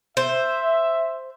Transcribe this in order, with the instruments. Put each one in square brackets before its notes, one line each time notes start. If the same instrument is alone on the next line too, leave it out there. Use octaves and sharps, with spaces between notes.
[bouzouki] C5 [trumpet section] E5